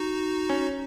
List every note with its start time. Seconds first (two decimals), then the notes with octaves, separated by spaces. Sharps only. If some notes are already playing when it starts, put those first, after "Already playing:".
Already playing: D#4 F#4
0.50 C#4